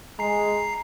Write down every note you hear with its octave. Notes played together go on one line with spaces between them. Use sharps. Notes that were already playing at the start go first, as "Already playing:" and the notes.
G#3 A#5 C7